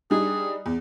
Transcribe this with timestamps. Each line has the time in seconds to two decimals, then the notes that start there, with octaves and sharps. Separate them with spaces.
0.11 G3 D4 D#4 G#4
0.66 E2